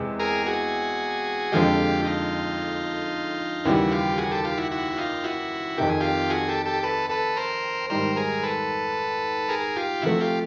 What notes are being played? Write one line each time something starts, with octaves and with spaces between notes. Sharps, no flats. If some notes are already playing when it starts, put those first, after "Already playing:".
Already playing: E2 C3 G#3 C4
G#4 A#4
F#4 G#4
F2 D3 F3 G#3 F4 G4
D#4 F4
D#2 C#3 E3 G3 E4 F#4
F4 G4
F#4 G#4
G4 A4
F4 G4
E4 F#4
E4 F#4
F#4
D#4 F4
E4 F#4
F2 C3 D#3 G4
G#4
F4 G4
F#4 G#4
G4 A4
G4 A4
A4 B4
A4 B4
A#4 C5
G#2 D#3 G3 A#4 C5
G#4 A#4
A4 B4
G#4 A#4
F4 G4
C3 F3 A3 E4 F#4
F4 G4